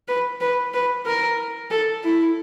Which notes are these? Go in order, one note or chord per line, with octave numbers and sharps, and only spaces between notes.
B4
B4
B4
A#4
A4
E4